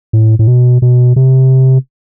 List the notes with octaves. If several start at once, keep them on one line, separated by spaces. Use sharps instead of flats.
A2
A2
B2
B2
C3